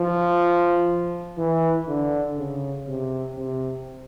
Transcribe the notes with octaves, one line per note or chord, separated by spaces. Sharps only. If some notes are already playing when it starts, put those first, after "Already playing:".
Already playing: F3
E3
D3
C#3
C3
C3